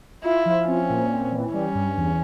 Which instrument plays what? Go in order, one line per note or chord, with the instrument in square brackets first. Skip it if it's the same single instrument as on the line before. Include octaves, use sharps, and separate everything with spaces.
[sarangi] E4 [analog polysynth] F4
[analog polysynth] F3
[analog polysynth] C4 [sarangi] C#4
[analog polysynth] A#2
C4
E3
[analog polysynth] G3 [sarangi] C#4
[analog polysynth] G2
E2